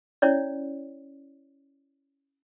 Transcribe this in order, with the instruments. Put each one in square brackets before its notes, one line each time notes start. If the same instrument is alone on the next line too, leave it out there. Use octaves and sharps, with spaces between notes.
[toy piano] C#4 E4 C#5 D5